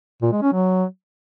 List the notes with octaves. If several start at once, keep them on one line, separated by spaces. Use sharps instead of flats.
A#2
G#3
C#4
F#3